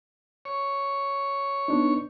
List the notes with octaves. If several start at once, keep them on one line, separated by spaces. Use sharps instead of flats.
C#5
B3 D4 D#4